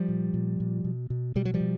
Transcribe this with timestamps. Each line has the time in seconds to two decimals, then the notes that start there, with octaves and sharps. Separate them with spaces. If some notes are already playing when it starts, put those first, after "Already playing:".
Already playing: F3 G3
0.09 A#2
0.34 A#2
0.60 A#2
0.84 B2
1.10 B2
1.36 B2 G3
1.45 F#3
1.54 F3 G3
1.60 B2